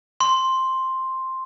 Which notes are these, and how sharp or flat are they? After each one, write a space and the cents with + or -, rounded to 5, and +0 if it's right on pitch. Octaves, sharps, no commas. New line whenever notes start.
C6 +5